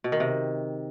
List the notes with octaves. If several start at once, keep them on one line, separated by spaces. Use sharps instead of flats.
B2
D#3
C3